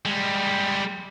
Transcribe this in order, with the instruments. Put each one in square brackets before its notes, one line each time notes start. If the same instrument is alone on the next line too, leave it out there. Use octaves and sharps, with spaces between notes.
[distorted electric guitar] G3 G#3